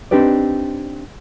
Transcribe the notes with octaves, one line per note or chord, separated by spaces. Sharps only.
C4 D4 D#4 G4 B4 D5